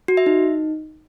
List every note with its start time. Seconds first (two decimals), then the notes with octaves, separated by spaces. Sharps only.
0.08 F#4
0.17 E5
0.26 D#4